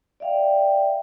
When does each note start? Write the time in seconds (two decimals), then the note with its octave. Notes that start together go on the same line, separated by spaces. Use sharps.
0.20 D5 E5 F5 G5